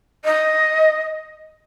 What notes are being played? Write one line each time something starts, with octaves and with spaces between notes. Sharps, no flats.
D#5